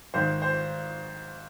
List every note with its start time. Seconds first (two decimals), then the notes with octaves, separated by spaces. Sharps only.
0.14 G#1 G#2 D#3 C5
0.42 C5